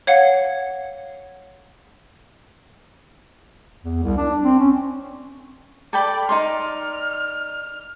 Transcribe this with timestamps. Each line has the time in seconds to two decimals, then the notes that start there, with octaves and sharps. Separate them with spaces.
0.07 C#5 F5 F#5
3.83 E2
4.03 C2
4.18 D4
4.44 C4
4.59 C#4
5.93 A4 D5 G5 B5
6.29 D#4 D5 C6 F6